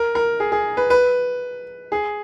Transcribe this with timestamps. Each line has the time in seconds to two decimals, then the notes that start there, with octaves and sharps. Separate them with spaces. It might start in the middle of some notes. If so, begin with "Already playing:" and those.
Already playing: A#4
0.15 A#4
0.40 G#4
0.52 G#4
0.77 B4
0.90 B4
1.92 G#4